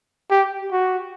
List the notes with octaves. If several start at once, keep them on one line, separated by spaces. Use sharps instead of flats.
G4
F#4